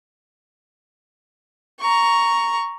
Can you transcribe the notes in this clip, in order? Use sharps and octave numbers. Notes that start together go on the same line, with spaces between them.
A#5 C#6